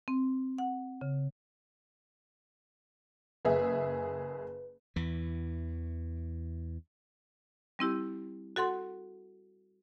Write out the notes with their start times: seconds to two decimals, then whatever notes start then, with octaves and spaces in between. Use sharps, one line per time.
0.08 C4
0.58 F#5
1.01 C#3
3.45 F#1 G#4 B4 E5
4.96 E2 E3
7.79 G3 C4 E4 G4
8.56 F#4 A4 F#5 C6